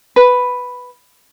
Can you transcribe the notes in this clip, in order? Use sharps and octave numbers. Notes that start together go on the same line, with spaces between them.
B4